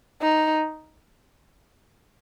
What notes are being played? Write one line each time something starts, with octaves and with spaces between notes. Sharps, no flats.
D#4